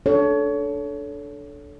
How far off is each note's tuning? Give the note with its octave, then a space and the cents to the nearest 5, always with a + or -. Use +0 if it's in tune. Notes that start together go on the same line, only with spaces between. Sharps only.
D4 +0 A4 -10 C#5 +25